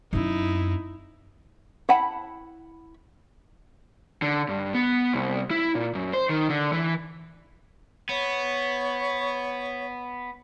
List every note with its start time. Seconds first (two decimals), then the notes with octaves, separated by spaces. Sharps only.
0.13 F#2 C4 D#4 E4
1.89 E4 F#5 A5 B5
4.22 D3
4.49 G2
4.74 B3
5.13 C2
5.51 E4
5.75 A#2
5.95 F#2
6.13 C5
6.29 D#3
6.50 D3
6.73 E3
8.09 B3 C#5